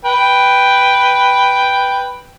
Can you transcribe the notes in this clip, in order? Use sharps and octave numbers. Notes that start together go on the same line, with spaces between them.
B4 G5